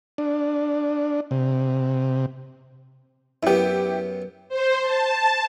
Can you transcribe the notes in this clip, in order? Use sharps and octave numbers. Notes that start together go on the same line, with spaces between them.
D4
C3
F#2 B3 E4 G4
C5
A5